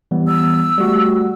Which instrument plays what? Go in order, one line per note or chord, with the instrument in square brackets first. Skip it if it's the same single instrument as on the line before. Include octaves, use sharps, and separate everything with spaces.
[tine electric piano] E3 G3 B3
[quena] E6
[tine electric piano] G3 A3 F#4